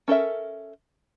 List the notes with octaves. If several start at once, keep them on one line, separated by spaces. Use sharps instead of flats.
C#4 A4 A#4 E5